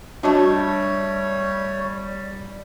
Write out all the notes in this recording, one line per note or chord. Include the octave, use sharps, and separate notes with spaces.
G3 A3 D4 F#4 A4 C#5 D#5